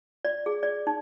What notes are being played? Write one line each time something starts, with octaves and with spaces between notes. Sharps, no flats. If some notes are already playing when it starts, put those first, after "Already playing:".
D5
G#4
D5
D#4